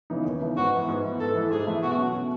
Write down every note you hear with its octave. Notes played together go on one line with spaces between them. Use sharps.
C#3 E3 B3 D#4
D#2
C#3 E3 B3 D#4
G#2 F#4
E3 B3
G#2
E3 B3
G#2 A4
E3 A3 E4 B4
G#2 G#4
E3 A3 E4 B4
B2 F#4
F#3 C#4
B2